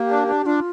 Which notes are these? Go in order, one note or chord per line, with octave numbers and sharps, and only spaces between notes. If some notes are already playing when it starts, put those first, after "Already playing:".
Already playing: A#3 G4
D4
D4
D4 F4